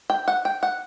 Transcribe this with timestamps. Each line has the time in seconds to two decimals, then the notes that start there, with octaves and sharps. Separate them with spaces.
0.10 G5
0.28 F#5
0.45 G5
0.63 F#5